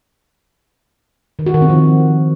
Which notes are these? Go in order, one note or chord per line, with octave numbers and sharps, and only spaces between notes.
D#3
F#4
D#3
C4
F3